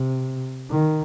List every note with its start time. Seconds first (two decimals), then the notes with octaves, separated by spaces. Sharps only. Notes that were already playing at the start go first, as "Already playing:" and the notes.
Already playing: C3
0.71 D#3